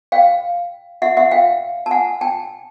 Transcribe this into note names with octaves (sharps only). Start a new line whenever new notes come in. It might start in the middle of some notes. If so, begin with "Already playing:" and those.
F5 G5
E5 F#5
E5 F#5
F5 G5
A5
F#5 G#5
G5 A5